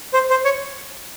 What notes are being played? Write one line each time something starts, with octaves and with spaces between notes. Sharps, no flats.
C5
C5
C#5